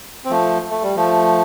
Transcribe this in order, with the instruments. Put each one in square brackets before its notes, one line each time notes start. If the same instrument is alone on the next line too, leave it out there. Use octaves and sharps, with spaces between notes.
[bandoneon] C4
F3 A3
A3
G3
F3 A3